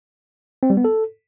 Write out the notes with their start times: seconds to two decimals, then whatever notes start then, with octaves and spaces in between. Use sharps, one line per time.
0.63 C4
0.70 G3
0.77 B3
0.85 A4